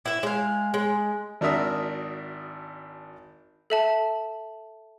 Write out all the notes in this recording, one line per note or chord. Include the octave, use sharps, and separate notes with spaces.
E4 E5
G#3 F5
G#3
G#1 D4 F#4 A#4 E5 D#6
A4 E5 A5